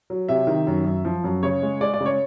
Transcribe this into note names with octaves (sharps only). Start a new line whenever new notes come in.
F#3
C3 E5
D#3
F#2
F#2
F3
F#2
C#3 C#5
G#3
G#3 D5
D5
C#3
C#5